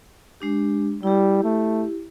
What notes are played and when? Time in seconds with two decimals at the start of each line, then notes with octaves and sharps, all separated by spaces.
0.40 G#3 D4 G4
1.03 G3 E4 G4
1.44 A3